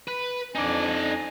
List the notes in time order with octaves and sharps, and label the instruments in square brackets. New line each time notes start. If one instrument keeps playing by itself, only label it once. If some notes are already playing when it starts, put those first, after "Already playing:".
[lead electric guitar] B4
[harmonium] F2 D4 G#5 [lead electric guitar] D#4 D5